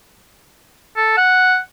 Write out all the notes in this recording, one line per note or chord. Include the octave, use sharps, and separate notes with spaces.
A4
F#5